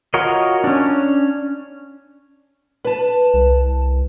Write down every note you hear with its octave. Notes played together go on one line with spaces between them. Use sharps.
F4 F#4 A#4 C#5 D#5
C#4 D4
B4 A5
C2